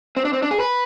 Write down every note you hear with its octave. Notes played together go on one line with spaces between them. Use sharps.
C4
D4
C4
D4
G#4
B4